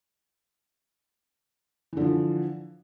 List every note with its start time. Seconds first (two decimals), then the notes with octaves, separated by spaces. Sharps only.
1.93 E3
1.97 D3
2.01 F3